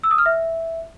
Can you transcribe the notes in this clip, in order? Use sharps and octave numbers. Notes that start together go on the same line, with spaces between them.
E6
D#6
F6
E5